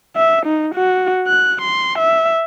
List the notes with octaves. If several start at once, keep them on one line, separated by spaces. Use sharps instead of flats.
E5
D#4
F#4
F#6
C6
E5